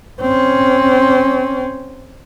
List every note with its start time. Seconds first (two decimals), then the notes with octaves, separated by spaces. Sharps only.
0.21 C4 C#4